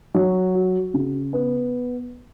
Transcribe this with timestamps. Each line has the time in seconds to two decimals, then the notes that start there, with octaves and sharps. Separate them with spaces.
0.14 F#3
0.54 F#4
0.94 C#3
1.33 B3